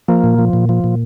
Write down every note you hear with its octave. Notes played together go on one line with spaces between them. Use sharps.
F3 A#3
A#2
F3
A#2
F3
A#2